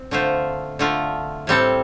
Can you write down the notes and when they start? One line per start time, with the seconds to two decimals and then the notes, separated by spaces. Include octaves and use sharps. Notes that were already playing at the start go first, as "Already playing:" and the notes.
Already playing: C4
0.11 D3 A3 F4 C5
0.79 D3 A3 F4
1.47 A2 G3 C4 A4